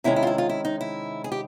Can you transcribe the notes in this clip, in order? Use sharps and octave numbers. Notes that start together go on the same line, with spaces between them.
C3 D#3 G#3 C#4 E4
E4
F4
E4
F4
E4
D#4
E4
G#4
G4